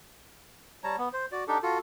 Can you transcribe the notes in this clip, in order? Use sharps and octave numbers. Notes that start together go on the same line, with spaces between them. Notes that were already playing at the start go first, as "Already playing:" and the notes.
G3 C#5 A5 A#5
B3
C5
F#4 D5
D4 D#4 G4 A4
F4 F#4 A4